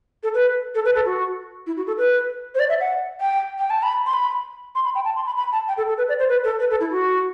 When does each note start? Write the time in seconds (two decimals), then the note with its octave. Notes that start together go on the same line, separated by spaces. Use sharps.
0.23 A4
0.34 B4
0.75 A4
0.85 B4
0.95 A4
1.05 F#4
1.67 E4
1.77 F#4
1.87 A4
1.98 B4
2.55 C5
2.59 D5
2.69 E5
2.81 F#5
3.20 G5
3.58 G5
3.70 A5
3.83 B5
4.06 C6
4.13 B5
4.75 C6
4.85 B5
4.95 G5
5.05 A5
5.16 C6
5.26 B5
5.37 B5
5.52 A5
5.68 G5
5.77 A4
5.89 A4
5.98 B4
6.09 D5
6.19 C5
6.29 B4
6.44 A4
6.60 B4
6.71 A4
6.80 E4
6.91 F#4